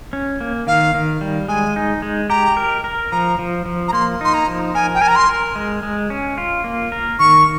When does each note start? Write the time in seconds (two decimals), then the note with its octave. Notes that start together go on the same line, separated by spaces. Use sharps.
0.13 C#4
0.41 A#3
0.67 D#3 F5
0.95 D#3
1.21 G3
1.48 G#3 G#5
1.76 D#4
2.02 G#3
2.30 G4 A#5
2.57 A#4
2.84 A#4
3.12 F3 A#5
3.39 F3
3.65 F3
3.88 A#5
3.93 A#3 C6
4.21 D#4 C6
4.34 A#5
4.47 F3
4.75 A#4 G#5
4.94 G5
5.01 A#4 G#5
5.08 A#5
5.16 C6
5.29 A#4
5.56 G#3
5.83 G#3
6.10 C#4
6.38 F4
6.64 A#3
6.92 A#4
7.19 D#3 C#6